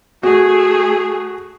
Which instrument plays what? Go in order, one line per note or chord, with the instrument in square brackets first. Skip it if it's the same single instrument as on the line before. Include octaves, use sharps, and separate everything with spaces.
[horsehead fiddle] A3 G#4 [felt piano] F#4